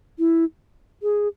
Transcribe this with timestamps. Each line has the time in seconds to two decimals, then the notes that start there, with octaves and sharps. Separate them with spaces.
0.19 E4
1.03 G#4